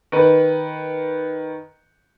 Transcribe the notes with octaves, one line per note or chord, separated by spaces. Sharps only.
D#3 B4